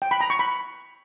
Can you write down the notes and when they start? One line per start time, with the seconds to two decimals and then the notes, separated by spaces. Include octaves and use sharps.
0.02 G5
0.11 B5
0.21 A#5
0.30 C#6
0.39 B5